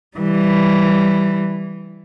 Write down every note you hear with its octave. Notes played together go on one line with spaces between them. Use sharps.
E3 G3